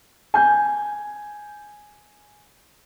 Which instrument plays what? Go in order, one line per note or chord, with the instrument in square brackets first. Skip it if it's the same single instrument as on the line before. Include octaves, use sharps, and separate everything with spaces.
[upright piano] G#5 G6